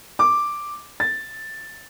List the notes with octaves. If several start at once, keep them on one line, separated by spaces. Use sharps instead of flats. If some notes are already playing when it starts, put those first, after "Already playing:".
D6
A6